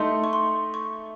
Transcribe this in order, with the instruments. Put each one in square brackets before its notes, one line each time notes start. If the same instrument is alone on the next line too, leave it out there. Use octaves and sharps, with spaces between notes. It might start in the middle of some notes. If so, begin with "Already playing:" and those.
Already playing: [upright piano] A3 D#4 A4 [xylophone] C6
[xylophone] C#6
C6
C#6